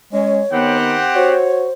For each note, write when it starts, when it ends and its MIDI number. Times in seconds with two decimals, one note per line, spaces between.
0.13 0.43 56
0.13 0.39 61
0.13 0.78 73
0.52 1.04 51
0.52 0.95 59
0.52 1.36 60
0.52 1.36 67
0.52 1.36 78
1.16 1.68 66
1.16 1.73 72
1.16 1.66 73